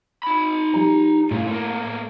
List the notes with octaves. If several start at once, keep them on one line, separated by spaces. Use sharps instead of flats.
D#4 B5
F3 G4 A#5
C#2 A2 C#3
A3 A#3